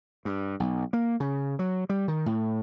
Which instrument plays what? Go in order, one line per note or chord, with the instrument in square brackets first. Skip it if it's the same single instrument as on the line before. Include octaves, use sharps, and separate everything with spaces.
[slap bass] G2
B1
A#3
C#3
F#3
G3
D#3
A2